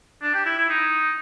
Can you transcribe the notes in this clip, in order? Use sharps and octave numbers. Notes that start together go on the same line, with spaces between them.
D4
G4
E4
E4
D#4